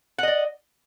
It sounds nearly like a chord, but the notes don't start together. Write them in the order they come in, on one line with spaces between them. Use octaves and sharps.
F#5 D#5 D5